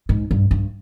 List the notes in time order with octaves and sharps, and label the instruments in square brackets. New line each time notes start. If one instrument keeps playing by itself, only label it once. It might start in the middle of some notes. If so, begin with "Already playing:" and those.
[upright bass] G#2
G2
G2